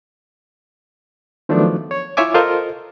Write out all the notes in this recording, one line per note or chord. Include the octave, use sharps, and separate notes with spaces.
D#3 F3 F#3 A3 B3 D4
C#5
E4 F4 C#5 E5 G#5 D6
F4 A4 A#4 C5 D#5